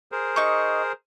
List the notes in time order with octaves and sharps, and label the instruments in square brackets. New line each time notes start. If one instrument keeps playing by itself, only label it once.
[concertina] G#4 A#4 C5
[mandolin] D#4 C#6